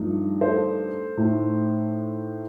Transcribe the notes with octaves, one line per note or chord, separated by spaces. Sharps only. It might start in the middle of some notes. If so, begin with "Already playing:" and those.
Already playing: G2 F3 A3 D#4
A4 C5
A2 A3 D#4